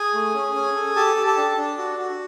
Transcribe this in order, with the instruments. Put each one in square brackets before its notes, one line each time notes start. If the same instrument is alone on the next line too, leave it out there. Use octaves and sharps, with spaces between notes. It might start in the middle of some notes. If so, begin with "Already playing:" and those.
Already playing: [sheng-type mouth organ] G#4 G#5
A3
C#4
C#4
A4
G4 A4 A5
G4
A4 A5
D4
D4
F#4
F#4